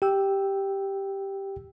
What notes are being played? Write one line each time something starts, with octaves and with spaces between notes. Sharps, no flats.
G4 G5 E6